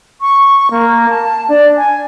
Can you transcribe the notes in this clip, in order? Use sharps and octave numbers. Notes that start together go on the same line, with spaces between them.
C#6
A#3
A5
D4
G#5